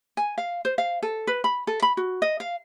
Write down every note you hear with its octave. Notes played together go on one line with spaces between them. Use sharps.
G#5
F5
C5
F5
A4
B4
B5
A4
B5
F#4
D#5
F5